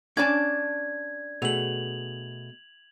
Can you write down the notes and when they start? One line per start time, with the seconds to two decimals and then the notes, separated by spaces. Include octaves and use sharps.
0.17 C#4 D4 D5 G#5 A5 G#6
1.42 B2 A3 G#4 F7 F#7